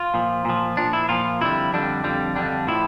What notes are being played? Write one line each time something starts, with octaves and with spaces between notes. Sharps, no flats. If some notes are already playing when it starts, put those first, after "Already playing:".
Already playing: F4
A#2 F3
A#2 F3
A#2 F3 D4
E4
A#2 F3 F4
F2 D3 G3 E4
F2 D3 G3 D4
F2 D3 G3
F2 D3 G3 D4
A2 F3 E4